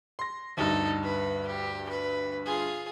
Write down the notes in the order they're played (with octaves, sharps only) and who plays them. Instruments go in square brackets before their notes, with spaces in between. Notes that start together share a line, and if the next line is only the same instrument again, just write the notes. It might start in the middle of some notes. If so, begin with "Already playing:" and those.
[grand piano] C6 A#6
[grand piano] D2 G2 [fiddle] D#4 A4
[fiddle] B4
G4
B4
F4 G#4